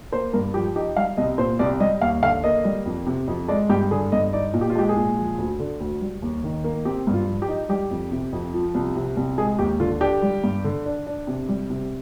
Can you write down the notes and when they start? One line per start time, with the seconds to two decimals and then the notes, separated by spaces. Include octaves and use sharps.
0.12 A#3 C5
0.33 G2 A#4
0.54 F3 G4
0.76 D#4 G4
0.96 G3 F5
1.17 C2 D#5
1.38 A#2 C5
1.59 C2 D5
1.80 G3 D#5
2.01 D#2 F5
2.22 D3 F5
2.44 A#3 D#5
2.65 G3
2.86 F2
3.07 C3
3.28 F2
3.48 G#3 D5
3.69 G2 G4
3.91 D3 G#4
4.12 G2 D#5
4.33 D#4 D5
4.54 A#2
4.61 G4
4.70 F4
4.75 G#3 G4
4.89 G#4
4.96 A#2
5.17 F3
5.38 D2
5.59 D3
5.80 D2
6.01 G3
6.22 D#2
6.44 D#3
6.64 A#3
6.85 C4 G4
7.07 G2
7.14 F4
7.28 F3
7.42 G4
7.48 D#4
7.69 G3 G4
7.91 F2
8.12 C3
8.33 F2
8.54 F3
8.75 C2
8.96 C3
9.17 C2
9.38 G#3 G#4
9.59 D#2 G4
9.80 D3 F4
10.01 D4 G4
10.22 G3
10.44 G2
10.64 D3
10.86 D4
11.07 D4
11.27 C3
11.49 G3
11.70 C3